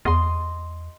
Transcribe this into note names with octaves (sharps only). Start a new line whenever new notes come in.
E2 D#5 C6